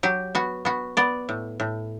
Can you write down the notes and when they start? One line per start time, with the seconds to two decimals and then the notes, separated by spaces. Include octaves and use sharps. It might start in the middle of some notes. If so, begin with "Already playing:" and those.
0.03 F#3 G4
0.35 B3 F#4
0.65 B3 F#4
0.97 B3 D5
1.29 A2
1.60 A2